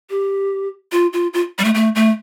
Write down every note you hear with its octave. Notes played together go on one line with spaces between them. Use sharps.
G4
F4
F4
F4
G3
A3
A3
A3